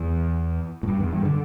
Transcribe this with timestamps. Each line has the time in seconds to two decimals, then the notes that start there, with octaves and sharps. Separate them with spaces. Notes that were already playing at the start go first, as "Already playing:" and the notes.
Already playing: E2
0.83 A2
0.88 G2
1.01 E2
1.12 G2
1.25 D3